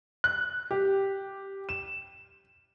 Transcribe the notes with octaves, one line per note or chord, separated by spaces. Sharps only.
F#6
G4
E7